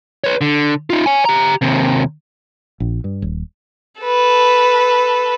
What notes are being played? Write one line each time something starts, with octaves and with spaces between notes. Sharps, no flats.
B4 C#5
D3
D#4 F4
C#5 G#5
G4 A#5
D#2 C3
A#1
G2
D#1
A4 B4